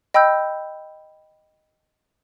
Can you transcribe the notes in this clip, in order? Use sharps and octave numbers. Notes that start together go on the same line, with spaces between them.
D#5 G5 B5 E6 G6